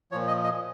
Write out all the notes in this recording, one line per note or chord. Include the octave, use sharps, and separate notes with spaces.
A#2 F3 C#5
D#5
D#5